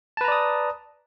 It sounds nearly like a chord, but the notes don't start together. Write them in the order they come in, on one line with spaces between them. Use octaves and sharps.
A5 B4 A#5 D5 D#6